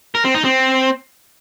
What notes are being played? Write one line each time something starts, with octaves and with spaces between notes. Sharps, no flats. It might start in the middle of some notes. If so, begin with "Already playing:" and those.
A#4
C4
D#4
C4